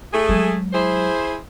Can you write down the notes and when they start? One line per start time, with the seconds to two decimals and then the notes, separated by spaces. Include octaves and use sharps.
0.13 A3 G#4
0.29 F#3 G#3
0.73 E4 G#4 C5